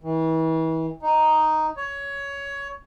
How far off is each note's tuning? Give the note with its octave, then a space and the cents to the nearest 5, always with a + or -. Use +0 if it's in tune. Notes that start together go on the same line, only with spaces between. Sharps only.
E3 -35
D#4 +0
C#5 +15